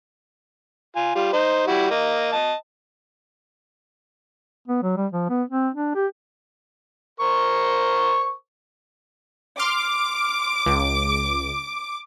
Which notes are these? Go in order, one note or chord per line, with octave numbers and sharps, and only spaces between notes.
F4 G#5
G3 F4
D#4 C5
G3 E4 F#4
A#3 D#5
D#5 A5
B3
F#3
G3
F3
B3
C4
D4
G4
A#4 C5 C#6
C6 D6 F6
C#2